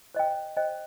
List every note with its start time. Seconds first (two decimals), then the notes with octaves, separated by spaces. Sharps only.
0.15 C5 D#5 G5
0.57 C5 D#5 G5